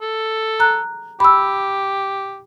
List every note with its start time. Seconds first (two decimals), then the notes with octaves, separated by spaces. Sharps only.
0.01 A4
0.60 A#5 F#6
1.20 G4 B5 E6